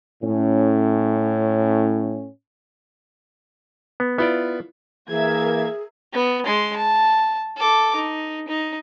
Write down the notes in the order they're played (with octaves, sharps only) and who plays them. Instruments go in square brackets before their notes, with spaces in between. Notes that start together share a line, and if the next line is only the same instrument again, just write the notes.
[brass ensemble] A2 C#4
[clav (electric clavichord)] B3
[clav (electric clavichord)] B3 D5 [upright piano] E4 F4
[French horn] E3 [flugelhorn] A#3 [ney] G#4 [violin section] A#4 E5 G#6
[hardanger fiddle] B3
G#3 C6
A5
A4 D6
D#4
D#4